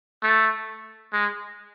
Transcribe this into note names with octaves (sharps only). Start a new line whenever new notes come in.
A3
G#3